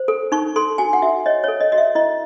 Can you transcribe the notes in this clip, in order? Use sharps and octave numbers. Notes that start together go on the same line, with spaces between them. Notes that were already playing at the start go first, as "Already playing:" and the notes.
Already playing: C5
A4
D#4 C#6
A4 C6
F#4 G#5
F#5
F#4 E5
C#5 D#5
A4 C#5
D#5
F#4 D#5
E5
E4 D#5